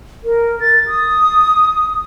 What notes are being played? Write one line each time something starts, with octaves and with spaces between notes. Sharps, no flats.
A#4
A6
D#6